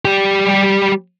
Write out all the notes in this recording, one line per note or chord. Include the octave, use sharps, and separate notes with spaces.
G3 G4